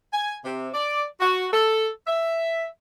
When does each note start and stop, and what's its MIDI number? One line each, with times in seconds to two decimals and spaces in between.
0.13 0.36 80
0.45 0.69 48
0.74 1.04 74
1.20 1.47 66
1.53 1.88 69
2.07 2.65 76